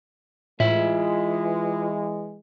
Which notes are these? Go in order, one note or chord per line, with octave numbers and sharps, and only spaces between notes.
A2 E3 G#3 F4 E5